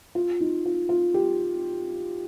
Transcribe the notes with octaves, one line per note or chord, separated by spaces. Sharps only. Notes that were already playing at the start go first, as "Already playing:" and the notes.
F4
D#4
F4
F4
G4